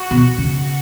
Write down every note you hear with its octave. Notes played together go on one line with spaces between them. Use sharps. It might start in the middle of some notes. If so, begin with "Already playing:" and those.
Already playing: F#4
B2
C#3